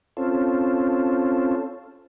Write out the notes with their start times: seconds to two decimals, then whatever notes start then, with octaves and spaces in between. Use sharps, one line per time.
0.17 C4 C#4 F4 A4